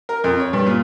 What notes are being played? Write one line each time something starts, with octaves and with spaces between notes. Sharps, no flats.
A#4
F2
C#5
G2
A#2